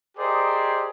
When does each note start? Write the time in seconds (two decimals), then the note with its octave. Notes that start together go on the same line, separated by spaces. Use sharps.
0.18 G4 G#4 A#4 C5 D5 D#5